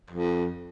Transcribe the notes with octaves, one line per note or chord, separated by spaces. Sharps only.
F2